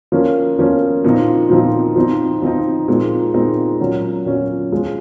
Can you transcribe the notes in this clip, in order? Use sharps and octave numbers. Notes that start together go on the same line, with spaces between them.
F3 A#3 C#4
F3 A#3 C#4
A#2 F3 C4 D#4
A#2 F3 C4 D#4
F3 C4 D#4
F3 C4 D#4
A#2 G#3 C4 D#4
A#2 G#3 C4 D#4
A#2 F#3 C#4
A#2 F#3 C#4
F3 G#3 C#4